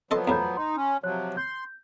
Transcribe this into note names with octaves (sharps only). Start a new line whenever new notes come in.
F3 F#3 B3 A4 D#5 C6
E2 A2 A#5 B5 G6
D#4 C6
C#4
C3 F3 F#3 C#5 F#6
C6 G6